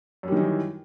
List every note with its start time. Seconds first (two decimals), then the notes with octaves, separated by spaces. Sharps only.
0.23 F#2
0.28 G3
0.32 D#3
0.37 E3